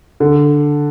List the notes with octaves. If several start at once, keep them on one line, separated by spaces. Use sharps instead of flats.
D3